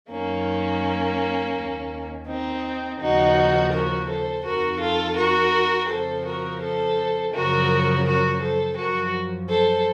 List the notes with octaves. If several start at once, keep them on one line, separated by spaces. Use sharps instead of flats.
F#2 D#3 A#3 C#4
D#2 D#3
C4 D#4
D#2 C#3 F3 D#4 F#4
F#4 A#4
A4 C5
F2 D#3 F#4 A#4
F4 A4
F#4 A#4
F2 C#3 F3 A4 C5
F#4 A#4
A4 C5
F#2 C#3 F3 F#4 A#4
F#4 A#4
A4 C5
F#2 F3 F#4 A#4
A4 C5